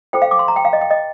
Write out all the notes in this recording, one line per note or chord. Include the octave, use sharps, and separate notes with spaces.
F4 A4 C5 G5
F5
D6
C6
A#5
G5
F5
D#5
G5
D#5